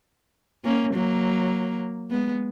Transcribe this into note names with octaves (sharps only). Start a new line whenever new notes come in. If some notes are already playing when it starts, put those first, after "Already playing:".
A#3 C#4
F#3 A#3
G#3 B3